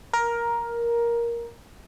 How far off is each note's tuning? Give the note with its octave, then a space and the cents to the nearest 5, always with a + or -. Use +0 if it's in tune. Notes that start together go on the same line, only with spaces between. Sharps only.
A#4 +10